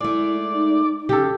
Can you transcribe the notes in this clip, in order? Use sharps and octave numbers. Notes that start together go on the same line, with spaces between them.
G#3 A3 E4 D5
D#4
C#3 C#4 G4 A4